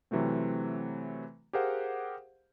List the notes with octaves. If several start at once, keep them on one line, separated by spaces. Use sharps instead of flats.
C3 E3 F#3 A3 C4
G4 G#4 A#4 C5 F5 F#5